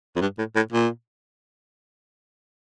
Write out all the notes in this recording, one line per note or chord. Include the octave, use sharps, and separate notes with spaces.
F2
G2
A2
A2
A#2